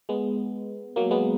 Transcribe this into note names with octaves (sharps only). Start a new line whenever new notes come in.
G#3 B3
F#3 A#3
G#3 B3